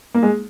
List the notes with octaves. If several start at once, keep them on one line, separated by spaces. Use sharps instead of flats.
A#3
G#3